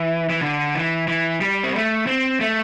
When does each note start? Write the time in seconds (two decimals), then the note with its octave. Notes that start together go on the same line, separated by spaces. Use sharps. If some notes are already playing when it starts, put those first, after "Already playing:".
Already playing: E3
0.30 E3
0.42 D3
0.75 E3
1.08 E3
1.41 G3
1.64 C4
1.75 A3
2.07 C4
2.41 A3